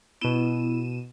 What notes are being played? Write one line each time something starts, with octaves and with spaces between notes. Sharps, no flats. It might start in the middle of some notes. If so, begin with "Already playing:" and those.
B2 B3 E4 D#7 E7